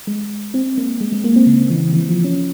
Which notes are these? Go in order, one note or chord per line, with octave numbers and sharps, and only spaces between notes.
G#3
C4
A#3
G#3
G#3
A#3
C4
C#3
E3
E3
F3
C#4